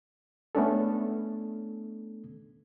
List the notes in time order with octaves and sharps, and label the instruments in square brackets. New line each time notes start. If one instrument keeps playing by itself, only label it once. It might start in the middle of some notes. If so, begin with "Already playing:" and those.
[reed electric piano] A3 B3 C#4 D4 A4